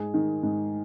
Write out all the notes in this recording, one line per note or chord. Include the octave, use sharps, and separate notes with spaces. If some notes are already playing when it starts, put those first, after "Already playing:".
Already playing: G#2 G#4
D#3
G#2